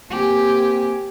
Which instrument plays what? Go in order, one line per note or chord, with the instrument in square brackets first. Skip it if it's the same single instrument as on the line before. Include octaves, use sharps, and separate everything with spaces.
[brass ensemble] A#3 C4 G#5 [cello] G4